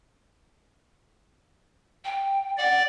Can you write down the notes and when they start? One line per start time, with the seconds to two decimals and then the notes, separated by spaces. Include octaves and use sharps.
2.05 G5
2.58 D5 F#5